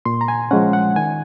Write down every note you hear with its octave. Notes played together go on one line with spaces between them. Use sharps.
A#2 C6
A#5
G#5
F3 G#3 C#4 F#5
F#5
D#3 G#5